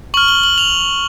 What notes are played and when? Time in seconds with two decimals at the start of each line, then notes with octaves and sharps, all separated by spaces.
0.14 C#6 F6 F#7
0.28 G7
0.44 F#7
0.58 F7